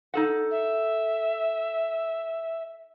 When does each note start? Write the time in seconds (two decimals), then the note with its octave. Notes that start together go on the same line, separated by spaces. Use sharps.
0.14 D#4 A4 F#5
0.51 E5